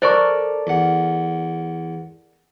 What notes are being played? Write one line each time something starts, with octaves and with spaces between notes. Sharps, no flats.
A4 A#4 C5 D5 C#6
E2 F#5